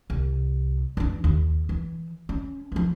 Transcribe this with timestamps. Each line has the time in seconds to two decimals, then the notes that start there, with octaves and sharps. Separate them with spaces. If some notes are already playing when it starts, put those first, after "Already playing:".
0.10 C2
0.97 E3 D4
1.24 D#2
1.69 E3
2.29 C#4
2.72 E3 F3